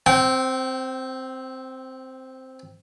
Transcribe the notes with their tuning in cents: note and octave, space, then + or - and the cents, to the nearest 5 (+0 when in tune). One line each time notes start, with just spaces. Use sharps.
C4 +0 G5 -30